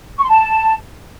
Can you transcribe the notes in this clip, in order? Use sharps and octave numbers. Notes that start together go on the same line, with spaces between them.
C#6
C6
A5